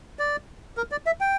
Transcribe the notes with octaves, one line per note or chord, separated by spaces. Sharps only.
D5
A#4
D5
E5
G5